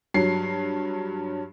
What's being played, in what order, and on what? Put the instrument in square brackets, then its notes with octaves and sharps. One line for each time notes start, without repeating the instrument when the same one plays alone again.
[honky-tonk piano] G2 F#3 C7